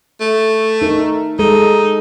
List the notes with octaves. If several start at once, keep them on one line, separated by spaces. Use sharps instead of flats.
A3
D#4 A#4
G#3 D#4 A4